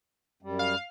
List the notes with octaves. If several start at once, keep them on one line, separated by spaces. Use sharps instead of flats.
F#2 G3
F5